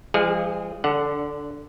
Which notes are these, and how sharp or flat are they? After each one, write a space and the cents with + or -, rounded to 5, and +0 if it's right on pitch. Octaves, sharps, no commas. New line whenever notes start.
F3 -40 G#3 -45 G#4 +0
D3 +0 D4 -25 F#5 +0